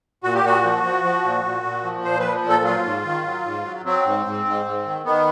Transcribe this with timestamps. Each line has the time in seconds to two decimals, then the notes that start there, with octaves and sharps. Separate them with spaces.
0.23 A#2 F#4
0.34 G4
0.44 A#2 F#4
0.64 F3
0.83 F3
1.04 F3
1.24 A#2
1.45 A#2
1.64 A#2
1.84 F3
2.04 A#2 C5
2.20 F3 B4
2.44 A#2
2.49 A4
2.64 F#3 F4
2.85 G#2
3.05 D#3
3.25 F#3
3.44 G#2
3.65 F#3
3.85 F#3 C4
4.05 G#2
4.26 G#2
4.46 G#2
4.66 G#2
4.85 D#3
5.05 D#3 B3